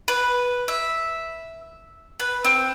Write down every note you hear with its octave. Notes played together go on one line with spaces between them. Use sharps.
B4
E5
B4
C4